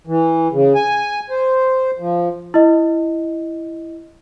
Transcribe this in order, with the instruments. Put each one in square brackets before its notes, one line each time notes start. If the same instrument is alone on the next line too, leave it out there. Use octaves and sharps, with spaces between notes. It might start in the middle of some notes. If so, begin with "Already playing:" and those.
[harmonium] E3
C#3
G#5
C5
F3
[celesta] E4 D#5